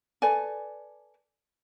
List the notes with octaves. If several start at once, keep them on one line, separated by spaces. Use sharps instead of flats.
A4 B4 D5 G#5